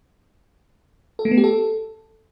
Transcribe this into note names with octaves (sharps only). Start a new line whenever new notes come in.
A4
A3
B3
G4
A4